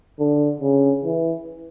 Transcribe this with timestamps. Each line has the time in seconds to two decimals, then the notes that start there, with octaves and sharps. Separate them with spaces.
0.19 D3
0.61 C#3
1.04 E3